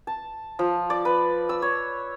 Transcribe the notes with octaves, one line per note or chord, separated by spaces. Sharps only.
A5
F3
D5
B4
E6
C#5